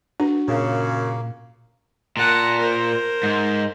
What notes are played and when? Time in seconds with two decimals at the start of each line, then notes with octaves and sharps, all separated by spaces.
0.20 D4 F#4
0.48 F#2 A#2 C#3 A#3
2.17 A#2 F#5 A5
2.58 A#4 C5
3.23 G#2